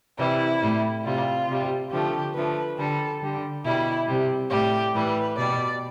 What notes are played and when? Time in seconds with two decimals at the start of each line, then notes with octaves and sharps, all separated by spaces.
0.18 C3 E3 G3 E4
0.61 A2 G3
1.04 C3 G3 F4
1.48 C3 G3
1.91 D3 F3 A3 G4
2.34 D3 F3 A3 B4
2.78 D3 G3 A4
3.22 D3 G3
3.65 B2 G3 E4
4.07 C3 G3
4.50 A2 G3 G4
4.94 A2 E3 G3 B4
5.37 B2 G3 D5